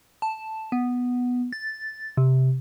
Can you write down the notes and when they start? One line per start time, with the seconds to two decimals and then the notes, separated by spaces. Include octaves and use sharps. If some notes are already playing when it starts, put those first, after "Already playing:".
0.22 A5
0.72 B3
1.53 A6
2.17 C3